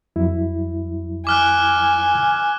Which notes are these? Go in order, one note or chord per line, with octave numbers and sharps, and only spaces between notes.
F2 F#3 E4
G#5 D6 F6 F#6